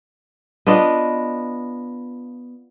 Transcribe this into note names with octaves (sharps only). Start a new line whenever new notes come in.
B3 D4 F4 D#5